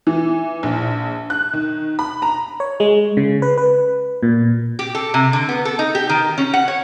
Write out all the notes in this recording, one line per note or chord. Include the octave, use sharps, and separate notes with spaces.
E3
A#1
F#6
D#3
B5
A#5
C#5
G#3
C#3
B4
B4
A#2
G4
A4
C3
D3
B3
A4
D#4
G4
D#3
C#4
F#5
C#5